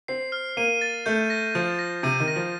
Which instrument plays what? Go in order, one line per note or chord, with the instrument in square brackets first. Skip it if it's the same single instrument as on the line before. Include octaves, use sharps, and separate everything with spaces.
[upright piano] C4 [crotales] C7
[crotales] F6
[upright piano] A#3 [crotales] D#7
[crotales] A6
[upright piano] A3 [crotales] G6
[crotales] A#6
[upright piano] F3 [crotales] G6
[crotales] A#6
[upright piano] C3 [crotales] D#7
[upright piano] D#3
[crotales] A#6
[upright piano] F3